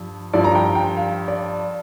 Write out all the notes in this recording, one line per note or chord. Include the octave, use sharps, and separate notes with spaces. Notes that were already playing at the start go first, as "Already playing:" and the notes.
Already playing: G2 F3
G2 F3 D5
A#5
G5
G5
F5
D5